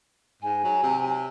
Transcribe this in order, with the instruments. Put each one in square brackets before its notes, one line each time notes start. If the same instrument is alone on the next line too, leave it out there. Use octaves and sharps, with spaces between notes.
[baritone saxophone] G#2 [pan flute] G#5
[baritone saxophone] F#3
C3